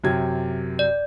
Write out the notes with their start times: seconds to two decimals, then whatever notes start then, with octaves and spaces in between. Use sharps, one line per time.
0.04 F#2 C3 G#6
0.79 D5